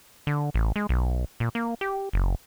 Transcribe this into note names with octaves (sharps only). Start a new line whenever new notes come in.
D3
A1
G#3
B1
A#2
A#3
G4
F#1